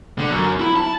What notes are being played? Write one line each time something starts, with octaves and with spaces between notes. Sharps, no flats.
D3
F#2
E4
A5